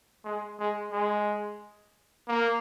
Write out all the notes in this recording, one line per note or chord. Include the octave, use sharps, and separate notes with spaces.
G#3
G#3
G#3
A#3